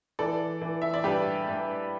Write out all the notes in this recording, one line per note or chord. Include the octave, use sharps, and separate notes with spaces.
E3 A4 D5
E3
E5
D5
G2 G4 B4
G2